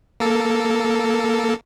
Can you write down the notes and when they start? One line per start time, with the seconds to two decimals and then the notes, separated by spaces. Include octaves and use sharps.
0.20 A#3 A4